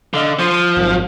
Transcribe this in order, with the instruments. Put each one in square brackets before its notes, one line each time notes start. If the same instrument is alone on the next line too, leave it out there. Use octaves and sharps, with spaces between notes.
[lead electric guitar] D3 [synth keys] D#5 F5
[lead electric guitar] F3 [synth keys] C6 C#7 D#7
[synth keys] D#7
G#1 F#2